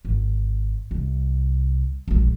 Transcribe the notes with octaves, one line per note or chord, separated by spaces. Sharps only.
G#1
C2
E1 A#1